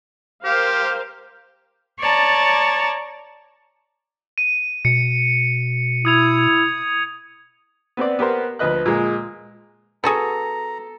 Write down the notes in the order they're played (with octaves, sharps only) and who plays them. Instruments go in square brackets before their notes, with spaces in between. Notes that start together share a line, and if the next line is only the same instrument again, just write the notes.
[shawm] G4 [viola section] A#4 C5 F5
[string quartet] C#5 D5 A5 A#5
[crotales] D#7
[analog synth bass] B2 [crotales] C#7
[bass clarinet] E4 [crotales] D#6 G#6 F7
[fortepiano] B3 C4 C5 D5
B3 G4 A#4 C5
D2 F3 B4 D#5 F#6
A#2 G#3
[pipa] B3 F#4 G#4 [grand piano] A4 [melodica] A#5